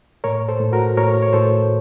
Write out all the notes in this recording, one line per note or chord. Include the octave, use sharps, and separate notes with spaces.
A2 A#4 C#5
A4 C5
A2
F#4 A#4
A2 A#4 C#5
C#5
A2 A4 C5